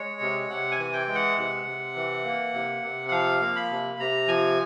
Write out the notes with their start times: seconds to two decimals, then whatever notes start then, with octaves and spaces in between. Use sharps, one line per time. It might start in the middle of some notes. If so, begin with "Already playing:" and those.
Already playing: G#3 C#5
0.21 C3
0.49 C3 F#5
0.72 G#5
0.79 E3
0.93 G5
1.07 G#3
1.15 F#5
1.38 C3
1.66 C3
1.96 E3
2.25 A#3
2.54 C3
2.82 C3
3.08 F#5
3.11 F3 F5
3.41 A#3
3.56 B5
3.70 C3
3.99 C3 A#5
4.28 F3 G#5